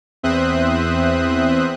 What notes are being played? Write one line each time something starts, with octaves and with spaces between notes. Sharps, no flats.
E2 C4 C5 E5 D#6 F#6